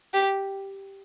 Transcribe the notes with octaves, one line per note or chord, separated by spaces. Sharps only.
G4